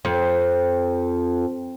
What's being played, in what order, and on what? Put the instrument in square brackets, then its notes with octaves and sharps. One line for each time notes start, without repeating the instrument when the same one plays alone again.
[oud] F2